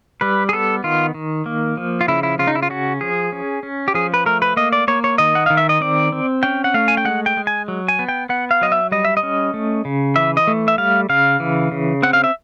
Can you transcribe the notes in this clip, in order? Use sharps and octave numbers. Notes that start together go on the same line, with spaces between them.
G3 B4
G#4
B3 A4
D#3 F4
D#3
A#3
F3
F4
C#3 E4
E4
C#3 F4
D#4
E4
F4
C#4 F#4
F3 G#4
C#4
C#4
G4
F3 G#4
B4
A3 A#4
B4
A#3 D#5
D5
A#3 C#5
C#5
D#3 D#5
F#5
D#3 F5
E5
D#5
C4 D5
C4
C#4 G5
F#5
A3 F5
G#5
G5
G#3 F#5
G5
G#3
G#5
F#3
G#5
B3
G5
B3 F#5
F5
F#3 D#5
E5
G3 D#5
E5
D#5
C#4
A3
C#3
E3 E5
D#5
A3
E5
G3 F5
C#3 F5
E3
C#3
C4 F#5
F5
E5